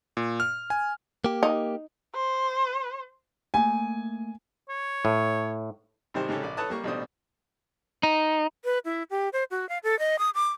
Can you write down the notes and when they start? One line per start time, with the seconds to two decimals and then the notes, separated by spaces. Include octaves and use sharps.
0.17 A#2
0.40 F6
0.70 G#5
1.24 A#3 G4
1.43 D#4
2.15 C5
3.54 A3 A#3 G#5
4.69 C#5
5.05 A2
6.14 G#1 C3 D#3 G3 C5
6.29 G#2 C#3 G4 A4 C#5
6.42 A#1 D5
6.57 A4 B4 C#5 A5 D#6 F#6
6.70 G3 A#3 C#6
6.84 A1 B2 G3 D4 C5 D#6
8.03 D#4
8.65 B4
8.85 E4
9.10 G4
9.33 C5
9.51 F#4
9.69 F5
9.84 A4
9.99 D#5
10.19 D#6
10.35 D6